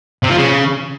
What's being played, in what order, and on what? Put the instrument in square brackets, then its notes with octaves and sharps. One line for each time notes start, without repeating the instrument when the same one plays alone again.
[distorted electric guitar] C3
F3
C#3